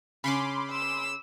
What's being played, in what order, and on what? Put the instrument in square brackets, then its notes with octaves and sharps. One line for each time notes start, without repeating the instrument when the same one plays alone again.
[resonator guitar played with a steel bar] C#3 C#4 [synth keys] B5 C6 D6
[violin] E6